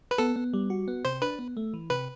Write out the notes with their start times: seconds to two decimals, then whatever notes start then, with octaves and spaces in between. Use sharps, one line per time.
0.11 B4
0.18 B3 A4
0.36 B3
0.53 G3
0.70 F#4
0.88 B3
1.05 C3 C5
1.22 D4 B4
1.39 B3
1.57 A3
1.74 E3
1.90 C3 B4